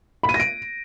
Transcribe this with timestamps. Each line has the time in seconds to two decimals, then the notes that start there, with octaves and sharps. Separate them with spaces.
0.23 B5
0.29 D#7
0.34 A#6
0.40 D7